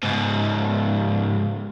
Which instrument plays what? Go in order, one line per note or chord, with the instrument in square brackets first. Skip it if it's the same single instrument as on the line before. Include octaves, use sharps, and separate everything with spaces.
[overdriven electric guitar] C#2 G#2